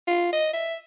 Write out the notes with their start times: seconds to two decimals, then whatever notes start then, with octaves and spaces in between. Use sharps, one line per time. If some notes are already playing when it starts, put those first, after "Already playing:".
0.07 F4
0.33 D#5
0.54 E5